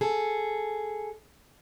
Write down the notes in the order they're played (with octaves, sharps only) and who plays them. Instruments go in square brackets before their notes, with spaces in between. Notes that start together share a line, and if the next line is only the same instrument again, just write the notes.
[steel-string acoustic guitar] G#4 A4